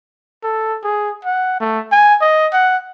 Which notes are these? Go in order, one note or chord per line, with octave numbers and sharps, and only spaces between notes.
A4
G#4
F#5
A3
G#5
D#5
F#5